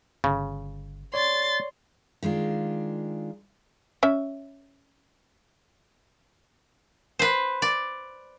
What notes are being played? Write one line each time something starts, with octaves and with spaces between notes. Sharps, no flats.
G1 C#3
C#5 D5 C6 A6
D#3 G#3 D4 F4
C#4 E5
B4 C5
D5